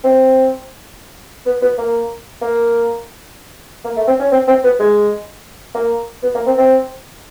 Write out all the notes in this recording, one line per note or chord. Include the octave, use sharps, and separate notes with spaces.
C4
B3
B3
A#3
A#3
A#3
A3
C4
C#4
C4
C4
B3
G#3
A#3
B3
A#3
C4
C4